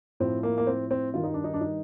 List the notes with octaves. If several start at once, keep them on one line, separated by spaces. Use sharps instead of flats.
A2 F3 C4
A#3
A#3
C4
C4
G2 D#3 G3 F4
D#4
D4
D#4
D4
D#4